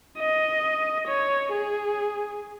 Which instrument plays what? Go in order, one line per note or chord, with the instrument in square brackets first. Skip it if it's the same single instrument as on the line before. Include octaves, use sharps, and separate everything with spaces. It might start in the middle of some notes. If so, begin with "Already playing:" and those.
[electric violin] D#5
C#5
G#4